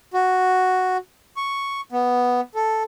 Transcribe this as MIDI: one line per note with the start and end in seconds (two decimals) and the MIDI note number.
0.14 0.97 66
1.37 1.81 85
1.92 2.41 59
2.55 2.83 69